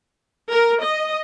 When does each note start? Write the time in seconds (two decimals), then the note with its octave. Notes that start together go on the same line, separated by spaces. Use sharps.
0.50 A#4
0.84 D#5